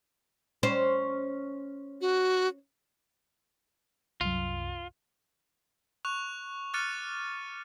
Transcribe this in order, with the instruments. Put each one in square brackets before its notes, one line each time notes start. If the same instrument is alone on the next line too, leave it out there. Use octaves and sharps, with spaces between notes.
[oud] C#4 C5
[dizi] F#4
[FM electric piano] C2 F#2 [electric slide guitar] F4
[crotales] C#6 F#6 F7
D6 F6 F#6 A6 C#7 D#7